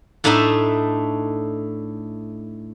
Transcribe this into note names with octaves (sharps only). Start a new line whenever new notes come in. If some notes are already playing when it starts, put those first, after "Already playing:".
A2 A3 D4 D#4 E5